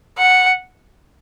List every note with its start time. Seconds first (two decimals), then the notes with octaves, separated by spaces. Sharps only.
0.18 F#5